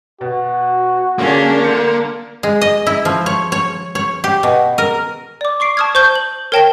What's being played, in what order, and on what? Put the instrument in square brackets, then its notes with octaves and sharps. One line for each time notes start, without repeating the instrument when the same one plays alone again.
[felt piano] B2 [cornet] F#4
[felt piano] D3 F4 G#4 [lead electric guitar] A#3 [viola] C#4 D4
[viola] D3 [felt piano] C6 G6 C#7
[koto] G#3
D#5
E4
F3
C#5
C#5
C#5
G4
B2
A#4
[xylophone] D5 D6
C#6 D6 C7 D7
A5 C#6 D#6 F6 G#6
C5 C#6 G6 G7
F#7
A#4 C#5 G5 A5 A#6 G7